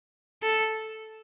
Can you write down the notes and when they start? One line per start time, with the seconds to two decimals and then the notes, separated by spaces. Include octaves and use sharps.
0.43 A4